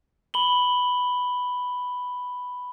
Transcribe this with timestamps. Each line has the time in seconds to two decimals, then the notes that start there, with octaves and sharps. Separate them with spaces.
0.34 B5 F#7 G7